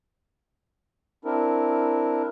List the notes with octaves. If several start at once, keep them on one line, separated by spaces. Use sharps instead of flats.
C4 D4 E4 A#4